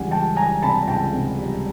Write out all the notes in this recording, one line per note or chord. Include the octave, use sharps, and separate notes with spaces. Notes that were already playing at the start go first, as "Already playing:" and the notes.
Already playing: C#2 E3 G3 F#5 G#5
G3 G5 A5
G3 G#5 A#5
C3 A5 B5
C#2 G5 A5
C3
G3